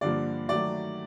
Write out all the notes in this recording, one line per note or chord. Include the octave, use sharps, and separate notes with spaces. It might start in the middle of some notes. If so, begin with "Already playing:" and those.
G2 D3 F3 A#3 D5
D#3 F#3 A3 D5